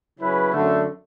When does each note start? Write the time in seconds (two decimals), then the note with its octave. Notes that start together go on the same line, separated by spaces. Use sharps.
0.19 C#3 F#3 C#4 E4 B4
0.53 F#2 D3 A3